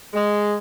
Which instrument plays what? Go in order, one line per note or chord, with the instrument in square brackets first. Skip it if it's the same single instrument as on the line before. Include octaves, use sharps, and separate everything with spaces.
[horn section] G#3